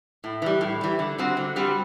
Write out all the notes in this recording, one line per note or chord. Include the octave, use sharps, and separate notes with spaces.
A2
E3 G3
A2
E3 G3
D3
G3 C4 F#4
D3
G3 C4 F#4